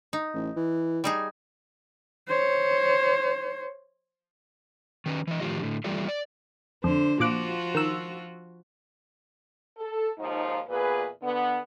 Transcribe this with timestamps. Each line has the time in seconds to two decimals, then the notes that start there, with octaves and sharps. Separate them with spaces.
0.13 D#4
0.34 A1
0.56 E3
1.04 G3 D#4 G#4
2.28 C5 C#5
5.06 D#3 C#4 B4
5.27 E3 D#5
5.41 A2 D#3 F3 F4 G4
5.61 A2 D3
5.84 E3 G3 A3 F4 G#4 D5
6.08 D5
6.84 F2 D3 C5
7.20 A#2 F3 F4 F#4 D6 F#6
7.75 D#3 E6
9.78 A4
10.19 D#2 G#2 F3 D#4 F4
10.68 E2 A#2 G#4 B4
11.23 D3 B3